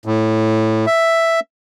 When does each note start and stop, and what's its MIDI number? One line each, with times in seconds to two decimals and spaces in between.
0.05 0.86 45
0.87 1.40 76